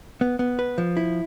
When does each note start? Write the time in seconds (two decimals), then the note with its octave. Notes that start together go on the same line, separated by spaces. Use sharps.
0.21 B3
0.39 B3
0.59 B4
0.78 F3
0.97 E4